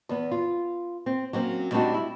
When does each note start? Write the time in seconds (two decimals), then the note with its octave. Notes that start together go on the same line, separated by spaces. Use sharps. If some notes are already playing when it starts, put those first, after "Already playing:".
0.09 E2 B3
0.32 F4
1.06 C4
1.33 F#3 A#3 C4 C#4
1.72 G3 A3 C4 D4 D#4 F#4
1.94 E4